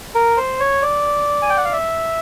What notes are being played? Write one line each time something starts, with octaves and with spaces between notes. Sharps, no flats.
A#4
C5
C#5
D5
G#5
G5
F#5
F5
E5